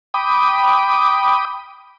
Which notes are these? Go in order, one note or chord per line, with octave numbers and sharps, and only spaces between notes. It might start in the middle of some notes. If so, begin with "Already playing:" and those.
G5 B5 D6 D#6